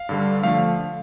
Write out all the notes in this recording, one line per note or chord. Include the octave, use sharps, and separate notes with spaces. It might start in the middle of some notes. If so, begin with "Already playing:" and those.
Already playing: F5
G2 D3 G3
D3 F3 A3 F5